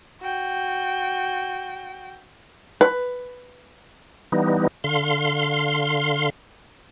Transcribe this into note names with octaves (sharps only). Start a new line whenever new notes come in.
F#4 G5
B4
E3 G3 B3 D#4
D3 F5 C6